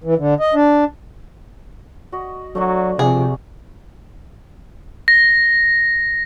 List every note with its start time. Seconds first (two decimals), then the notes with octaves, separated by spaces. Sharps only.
0.04 E3
0.18 D3
0.40 D#5
0.54 D4
2.12 F#4 D#5
2.55 F#3 A3 D4 F#4
2.99 C3 F3 G#4
5.08 A#6